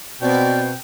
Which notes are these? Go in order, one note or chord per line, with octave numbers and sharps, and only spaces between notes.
B2 C4 D5 G5